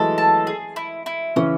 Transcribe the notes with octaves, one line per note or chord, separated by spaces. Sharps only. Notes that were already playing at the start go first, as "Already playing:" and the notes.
Already playing: E3 F#3 G#3 A3 A4
A5
G#4
E4
E4
C#3 E3 C#4